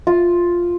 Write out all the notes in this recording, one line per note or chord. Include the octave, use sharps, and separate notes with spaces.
F4